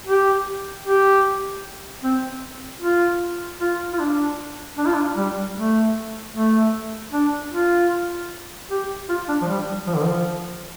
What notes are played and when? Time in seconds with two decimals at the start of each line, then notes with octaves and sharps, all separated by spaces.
0.07 G4
0.85 G4
2.03 C4
2.82 F4
3.60 F4
3.93 F4
3.99 D4
4.78 D4
4.86 F4
4.94 D4
5.16 G3
5.56 A3
6.34 A3
7.13 D4
7.52 F4
8.70 G4
9.09 F4
9.28 D4
9.42 F3
9.48 G3
9.87 F3
9.96 D3
10.04 F3